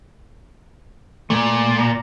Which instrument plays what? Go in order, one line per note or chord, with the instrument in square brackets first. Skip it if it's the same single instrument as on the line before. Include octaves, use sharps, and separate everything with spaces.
[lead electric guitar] A#2 [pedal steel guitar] A3
[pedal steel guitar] A#5